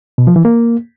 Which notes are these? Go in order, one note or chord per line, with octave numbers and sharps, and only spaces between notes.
B2
F3
E3
A#3